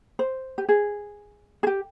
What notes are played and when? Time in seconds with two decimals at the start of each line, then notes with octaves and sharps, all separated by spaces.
0.19 C5
0.58 G4
0.69 G#4
1.63 G#4
1.67 G4